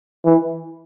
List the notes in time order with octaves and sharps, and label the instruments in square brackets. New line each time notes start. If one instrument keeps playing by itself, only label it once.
[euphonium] E3